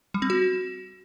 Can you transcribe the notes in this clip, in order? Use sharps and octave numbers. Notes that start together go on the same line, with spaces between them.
G3
C4
F#4